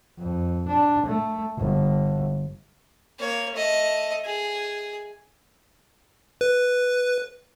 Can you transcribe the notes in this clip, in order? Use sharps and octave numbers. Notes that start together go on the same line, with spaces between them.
F2
D4
A3
G1
A#3 C#5
A3 D#5
G#4
B4